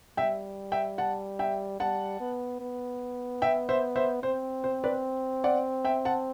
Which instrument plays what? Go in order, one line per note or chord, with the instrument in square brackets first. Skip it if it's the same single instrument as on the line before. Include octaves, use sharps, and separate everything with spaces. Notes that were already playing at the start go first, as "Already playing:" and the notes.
[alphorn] G3 [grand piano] E5 G5
[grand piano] E5 G5
F#5 A5
E5 G5
[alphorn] G3 [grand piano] F#5 A5
[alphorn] B3
B3
[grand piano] E5 G5
C5 E5
C5 E5
[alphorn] C4 [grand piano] C5
[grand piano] C5
B4 D5
D5 F#5
E5 G5
F#5 A5